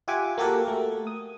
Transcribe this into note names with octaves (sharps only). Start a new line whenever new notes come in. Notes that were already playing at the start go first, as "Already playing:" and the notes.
F4 G4 E5 F#5 G#5 D6
A#3 F#4 G4 A4 A#4 F#5
A3 A#4
D#6